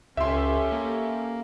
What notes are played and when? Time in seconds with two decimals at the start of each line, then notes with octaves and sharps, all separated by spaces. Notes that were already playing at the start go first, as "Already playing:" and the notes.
0.17 C#2 C#4 G4 A4 E5 C6
0.72 A#3